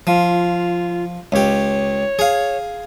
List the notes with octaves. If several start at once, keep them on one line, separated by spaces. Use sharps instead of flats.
F3 F4
C#2 G4 C#5
G#4 F5